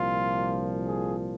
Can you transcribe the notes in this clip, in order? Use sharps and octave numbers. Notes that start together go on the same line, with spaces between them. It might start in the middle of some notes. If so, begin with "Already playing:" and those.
Already playing: C2 A#2 F3 F4
G#4